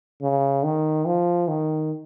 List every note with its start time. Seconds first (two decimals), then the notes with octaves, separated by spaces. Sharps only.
0.22 C#3
0.64 D#3
1.06 F3
1.48 D#3